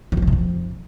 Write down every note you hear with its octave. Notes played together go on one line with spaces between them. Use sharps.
D3
G2
E3
C3
F2